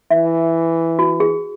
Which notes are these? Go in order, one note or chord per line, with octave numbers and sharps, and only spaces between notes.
E3 E5
F#4
G#4